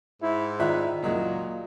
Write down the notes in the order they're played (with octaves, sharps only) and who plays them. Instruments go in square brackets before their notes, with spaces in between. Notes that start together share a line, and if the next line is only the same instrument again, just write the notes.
[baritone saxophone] G#2 [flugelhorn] E4
[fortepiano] D#3 E5 F#6 [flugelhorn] E4 [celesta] F4 D5 A#5
[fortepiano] C#2 F#3 G#3 [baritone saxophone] A#2 [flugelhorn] A#3